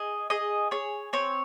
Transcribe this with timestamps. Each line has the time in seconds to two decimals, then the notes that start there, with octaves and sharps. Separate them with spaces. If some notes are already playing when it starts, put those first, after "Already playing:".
Already playing: G#4 D#5
0.30 G#4 D#5
0.71 G#4 C#5
1.13 C4 C#5